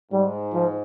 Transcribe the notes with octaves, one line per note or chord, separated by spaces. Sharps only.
G#2 G3
F3